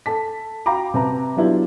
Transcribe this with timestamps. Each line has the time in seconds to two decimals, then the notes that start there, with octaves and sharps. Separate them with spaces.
0.06 A4 A5 B6
0.66 F#4 F5 G5 A#5 B5 D6
0.94 C3 C4 B4 A5 A#5
1.36 F#3 B3 D4 E4 F4 G4